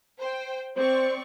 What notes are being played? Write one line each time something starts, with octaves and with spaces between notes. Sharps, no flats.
C5 G5
C4 C5 D5 C#6